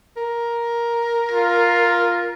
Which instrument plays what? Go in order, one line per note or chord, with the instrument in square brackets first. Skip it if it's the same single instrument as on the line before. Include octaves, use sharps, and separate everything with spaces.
[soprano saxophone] A#4
[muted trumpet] F4